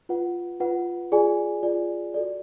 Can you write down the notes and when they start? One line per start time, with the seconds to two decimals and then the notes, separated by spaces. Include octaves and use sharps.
0.09 F4 B4 F#5
0.60 F4 B4 F#5
1.12 F4 G#4 D5 G#5
1.63 F4 G#4 D5 G#5
2.14 F#4 A4 D5